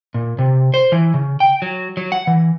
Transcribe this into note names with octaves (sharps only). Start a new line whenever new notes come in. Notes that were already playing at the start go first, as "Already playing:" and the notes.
A#2
C3
C5
E3
C#3
G5
F#3
F#3
F#5
E3